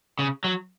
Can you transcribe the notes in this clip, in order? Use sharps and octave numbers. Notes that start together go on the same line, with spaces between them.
C#3
F#3